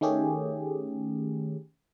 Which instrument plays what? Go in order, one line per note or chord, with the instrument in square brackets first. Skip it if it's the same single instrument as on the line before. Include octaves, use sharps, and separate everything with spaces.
[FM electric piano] D#3 A3 C#4 G4 G#4